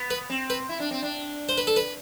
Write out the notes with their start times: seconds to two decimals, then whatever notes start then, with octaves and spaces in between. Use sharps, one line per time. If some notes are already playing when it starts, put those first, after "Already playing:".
Already playing: B3
0.11 B4
0.30 C4
0.50 B4
0.69 E4
0.80 D4
0.91 C4
1.02 D4
1.49 C5
1.58 B4
1.67 A4
1.76 B4